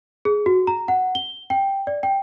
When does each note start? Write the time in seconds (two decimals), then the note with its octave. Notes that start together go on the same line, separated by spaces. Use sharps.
0.25 G#4
0.46 F#4
0.67 A#5
0.88 F#5
1.15 G7
1.50 G5
1.87 D5
2.03 G5